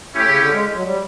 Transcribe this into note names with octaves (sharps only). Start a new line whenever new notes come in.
A2 C#4 E4 G4
C#3
D3
G#3
F#3
G3